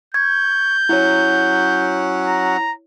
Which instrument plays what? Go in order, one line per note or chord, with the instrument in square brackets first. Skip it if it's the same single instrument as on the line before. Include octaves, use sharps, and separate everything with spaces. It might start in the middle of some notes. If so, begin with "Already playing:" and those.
[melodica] C#6 [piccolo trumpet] G6 [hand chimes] G#6
[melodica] F#3 C#4 F#5 [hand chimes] E4 C#5
[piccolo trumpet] A#5